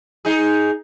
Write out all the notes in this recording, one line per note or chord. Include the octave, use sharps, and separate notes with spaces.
D#4 G#4